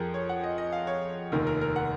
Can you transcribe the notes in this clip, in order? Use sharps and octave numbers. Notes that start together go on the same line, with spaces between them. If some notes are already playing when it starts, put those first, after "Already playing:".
Already playing: F2 F3 G#4 A#4
C#5
F#5
D#5
D#5
F5
C#5
F1 D#2 D#3 A#4
A#4
A#4
F#5